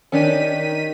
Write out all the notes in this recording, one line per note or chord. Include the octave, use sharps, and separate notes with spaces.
D#3 C#4 D4 G4 B6 D#7